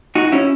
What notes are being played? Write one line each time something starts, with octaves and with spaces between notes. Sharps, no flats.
D#4 F#4
C#4 E4